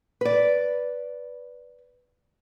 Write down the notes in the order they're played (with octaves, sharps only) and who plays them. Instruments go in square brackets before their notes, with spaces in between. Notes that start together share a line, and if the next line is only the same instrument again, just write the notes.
[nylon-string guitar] B4 D5